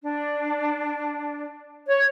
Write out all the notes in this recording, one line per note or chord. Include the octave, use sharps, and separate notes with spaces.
D4
C#5